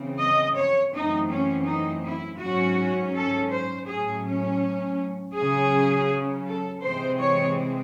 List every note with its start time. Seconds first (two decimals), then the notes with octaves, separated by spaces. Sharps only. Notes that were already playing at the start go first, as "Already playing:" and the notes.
Already playing: C#3 E3 C4
0.20 D#5
0.57 C#5
0.94 F#2 E3 A3 C4 D#4
1.30 C#4
1.67 D#4
2.04 E4
2.41 G#2 F#3 C#4 F#4
3.14 A4
3.51 C5
3.88 A2 F#3 A3 C#4 G#4
4.25 C#4
5.34 C#3 F#3 C#4 G#4
6.45 A4
6.82 C3 E3 G#3 C4 C5
7.19 C#5